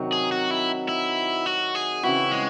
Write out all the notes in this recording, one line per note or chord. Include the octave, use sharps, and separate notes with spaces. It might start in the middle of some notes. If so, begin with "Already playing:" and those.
Already playing: C3 D#3 F#3
G#4
F#4
E4
E4
F#4
G#4
C#3 E3 C4 E4 F#4
G#3